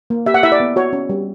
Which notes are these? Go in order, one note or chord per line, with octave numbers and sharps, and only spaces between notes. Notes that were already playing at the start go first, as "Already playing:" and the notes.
A#3
G4 E5
F#5
E4 E5
D5
B3
F#4 C#5
C#4
G3